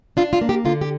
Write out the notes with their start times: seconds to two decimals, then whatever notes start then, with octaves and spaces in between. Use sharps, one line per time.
0.17 D4 F4
0.33 F4
0.41 A#3
0.49 G4
0.65 D3 F4
0.81 G4